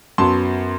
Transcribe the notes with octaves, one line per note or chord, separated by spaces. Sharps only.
F#2 F#3 B3 A5 C6